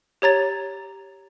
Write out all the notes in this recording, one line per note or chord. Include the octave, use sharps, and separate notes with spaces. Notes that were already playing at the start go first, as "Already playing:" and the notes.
G4 C#5 A#5 A6